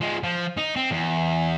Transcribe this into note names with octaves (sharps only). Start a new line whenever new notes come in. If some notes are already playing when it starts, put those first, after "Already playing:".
F3 G#3
F3
D#4
C4
E2